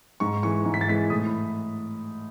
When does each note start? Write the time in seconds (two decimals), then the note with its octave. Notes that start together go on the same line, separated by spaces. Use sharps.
0.20 G#2 C#6
0.43 E3 G#3 C#6
0.65 G#2
0.74 B6
0.81 A6
0.88 E3 G#3 B6
1.10 A2 D#6
1.26 B5